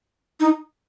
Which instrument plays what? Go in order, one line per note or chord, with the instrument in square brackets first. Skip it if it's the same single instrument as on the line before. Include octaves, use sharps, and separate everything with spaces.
[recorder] D#4